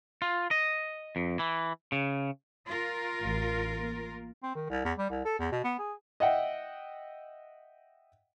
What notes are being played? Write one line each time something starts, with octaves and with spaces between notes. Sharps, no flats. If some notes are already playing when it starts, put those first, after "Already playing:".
F4
D#5
F2
E3
C#3
F4 A#4
A1
A#3
C4
D#3
C2
E2
G3
C2
A4
E2
B2
B3
G#4
D#5 E5 F#5 G5